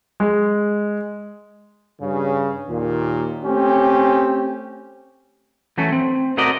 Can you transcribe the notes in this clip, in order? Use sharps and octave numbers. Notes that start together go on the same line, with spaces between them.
G#3
G2 C#3
D#2 A#2
A3 C4 C#4 G4
E3 F#3 A3 C#4
C4
A3 C4 F#4 A#4 D5 D#5